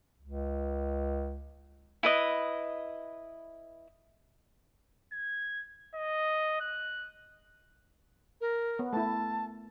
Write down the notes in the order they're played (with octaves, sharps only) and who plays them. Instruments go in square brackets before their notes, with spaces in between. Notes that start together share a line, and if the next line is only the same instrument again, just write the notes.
[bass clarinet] C#2
[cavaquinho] E4 B4 D#5
[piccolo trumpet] G#6
D#5
F#6
[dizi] A#4
[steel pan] B3
[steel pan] A3 E4 [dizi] A5